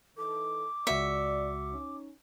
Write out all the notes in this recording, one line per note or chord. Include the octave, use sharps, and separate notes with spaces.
E3 D#4 A4 D6
C#2 F#4 D5 E5 C#7
C#4 D#4